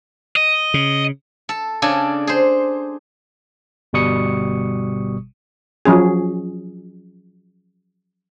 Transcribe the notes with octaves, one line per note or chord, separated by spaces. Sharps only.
D#5
C#3
A4
C#3 D4 A4 G#5
G#4 C5
G1 B2 G3 C#6 D#6 C#7
F3 F#3 C#4 G#4